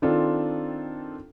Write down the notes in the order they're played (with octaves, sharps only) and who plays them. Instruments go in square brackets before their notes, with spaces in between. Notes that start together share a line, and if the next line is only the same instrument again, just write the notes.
[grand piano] D#3 C4 D4 F4 A4